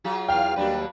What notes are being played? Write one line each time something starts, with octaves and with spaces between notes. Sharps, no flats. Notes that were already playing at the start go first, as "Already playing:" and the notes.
F#3 F4 G#4
E2 F5 G5 F6
D#2 F#3 G3 D4 B4